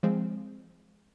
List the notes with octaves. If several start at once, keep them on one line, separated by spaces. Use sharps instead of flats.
F3 G#3 C4